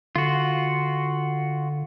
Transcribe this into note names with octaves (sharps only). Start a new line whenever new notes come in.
D3 F4 F#4